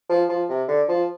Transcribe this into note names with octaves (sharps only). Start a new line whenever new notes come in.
F3
F3
C3
D3
F3